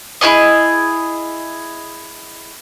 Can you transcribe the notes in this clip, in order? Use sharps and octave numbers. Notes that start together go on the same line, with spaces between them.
E4 F4 G#4 D#5